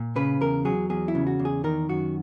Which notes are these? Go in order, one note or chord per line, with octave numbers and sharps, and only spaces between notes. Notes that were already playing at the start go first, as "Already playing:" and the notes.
Already playing: A#2
C#3 B4
E2 A#4
F#3 G#4
E2 G#4
E4
C#3
F#4
E2
G#4
D#3 A#4
F#2 F#4